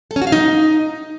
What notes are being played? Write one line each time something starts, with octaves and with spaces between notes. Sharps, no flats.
A4
C#4
F#4
F5
D#4